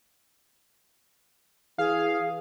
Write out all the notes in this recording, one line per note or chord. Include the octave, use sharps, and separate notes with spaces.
E3 G#4 F5